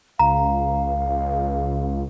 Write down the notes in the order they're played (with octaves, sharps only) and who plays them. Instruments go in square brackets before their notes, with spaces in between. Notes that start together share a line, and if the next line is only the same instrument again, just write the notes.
[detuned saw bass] C#2 [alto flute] F5 [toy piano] A#5